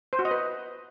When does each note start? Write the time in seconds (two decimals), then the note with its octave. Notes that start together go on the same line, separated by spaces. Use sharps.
0.13 C5
0.19 F#4
0.25 D#5
0.31 B4